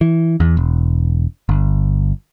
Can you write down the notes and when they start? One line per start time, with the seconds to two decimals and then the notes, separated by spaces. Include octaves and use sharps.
0.01 E3
0.40 E2
0.57 E1
1.49 G1